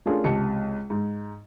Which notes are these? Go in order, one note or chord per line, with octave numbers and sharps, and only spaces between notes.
A3 C#4 D4 F4 G#4 A#4
C#2 C3 A5 C#7
G#2